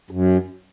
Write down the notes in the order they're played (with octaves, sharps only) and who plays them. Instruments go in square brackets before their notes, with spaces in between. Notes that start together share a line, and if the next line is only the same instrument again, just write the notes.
[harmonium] F#2